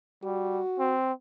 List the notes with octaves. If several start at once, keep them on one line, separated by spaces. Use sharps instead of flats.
G3 F#4
C4